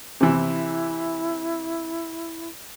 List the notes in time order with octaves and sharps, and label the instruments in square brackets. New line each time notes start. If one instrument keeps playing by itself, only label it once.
[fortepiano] C3 E3 [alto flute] E4